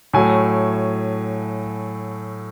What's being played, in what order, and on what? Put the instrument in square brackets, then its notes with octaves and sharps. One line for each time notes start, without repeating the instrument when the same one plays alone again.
[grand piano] A2 F#3 A3 G#5